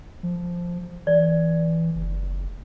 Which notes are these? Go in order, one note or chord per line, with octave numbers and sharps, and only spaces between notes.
F3
E3 D5
F#1